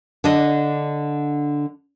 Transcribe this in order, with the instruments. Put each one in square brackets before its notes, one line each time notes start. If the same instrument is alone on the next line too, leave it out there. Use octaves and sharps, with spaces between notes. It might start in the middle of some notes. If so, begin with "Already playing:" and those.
[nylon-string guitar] D3 D4 D#5